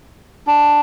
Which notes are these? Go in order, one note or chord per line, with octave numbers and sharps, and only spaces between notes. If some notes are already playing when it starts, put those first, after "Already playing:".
D4